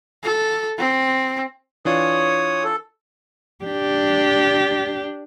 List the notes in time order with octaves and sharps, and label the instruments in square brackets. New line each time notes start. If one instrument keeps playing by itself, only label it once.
[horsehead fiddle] A4
C4
[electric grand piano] E3 D4 F4 [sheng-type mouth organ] C#5 D#6
[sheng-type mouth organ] A4
[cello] D4 G4